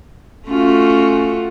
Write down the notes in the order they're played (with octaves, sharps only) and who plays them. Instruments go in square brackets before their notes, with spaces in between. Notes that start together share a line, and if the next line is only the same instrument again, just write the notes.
[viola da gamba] A3 F4 F#4 [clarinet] C#4